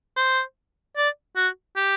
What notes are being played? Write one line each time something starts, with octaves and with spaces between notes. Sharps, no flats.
C5
D5
F#4
G4